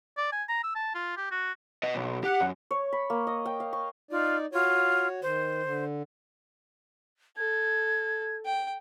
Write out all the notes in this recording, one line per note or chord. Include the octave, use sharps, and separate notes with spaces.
D5
G#5
A#5
E6
A5
F4
G4
F#4
B4 D#5
B1
G4 F#5
F#2
C#5
B5
A#3
D#5
G5
F5
C#6
D#4 F4 D5
F4 F#4 C#5
D#3 C5
D3
A4 G#6
G5